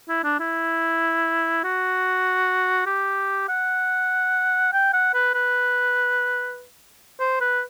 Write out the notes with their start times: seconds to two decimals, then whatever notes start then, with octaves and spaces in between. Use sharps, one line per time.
0.09 E4
0.24 D4
0.40 E4
1.64 F#4
2.86 G4
3.49 F#5
4.73 G5
4.93 F#5
5.14 B4
5.34 B4
7.20 C5
7.41 B4